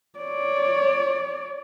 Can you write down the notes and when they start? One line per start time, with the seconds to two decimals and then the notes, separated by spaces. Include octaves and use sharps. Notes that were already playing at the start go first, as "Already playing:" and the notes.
0.19 C#5 D5